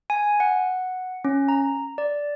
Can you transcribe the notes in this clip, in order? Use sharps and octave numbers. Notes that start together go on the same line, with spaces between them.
G#5
F#5
C#4
A#5
D5